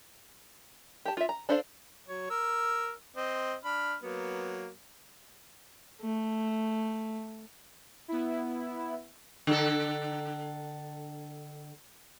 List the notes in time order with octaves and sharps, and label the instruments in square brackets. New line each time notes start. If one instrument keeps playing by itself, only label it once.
[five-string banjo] G4 A5
F4 E5
A#5
D4 A4 C5 D5 F5
[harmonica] F#3 C#5
A#4 E6
C4 D#5
D4 B5 F6
F#3 A#3 B3
[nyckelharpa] A3
[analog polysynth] B3 E4
[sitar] D3 A4